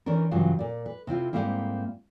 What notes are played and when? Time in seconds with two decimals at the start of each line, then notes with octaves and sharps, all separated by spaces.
0.06 D#3 E3 C#4 D4 A#4
0.31 G2 C#3 E3 F#3 D4 F4
0.59 A#2 D5
0.86 B4
1.07 C3 C4 E4 F4
1.33 G#2 F3 G3 A#3 C4 E4